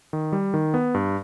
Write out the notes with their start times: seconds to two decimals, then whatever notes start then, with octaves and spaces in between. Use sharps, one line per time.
0.13 D#3
0.32 G3
0.54 D#3
0.74 B3
0.94 G2